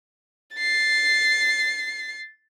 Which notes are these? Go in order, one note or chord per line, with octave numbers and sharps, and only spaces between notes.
A6 C7